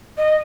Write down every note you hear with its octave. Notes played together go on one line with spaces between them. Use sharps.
D#5